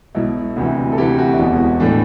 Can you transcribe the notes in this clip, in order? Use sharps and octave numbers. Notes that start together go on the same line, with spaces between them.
B1 B2 E4
D2 C3 E3
A4
D2 C3 E3 G4
F#4
E4
E1 E2 B2 F#4
A2 E3 D4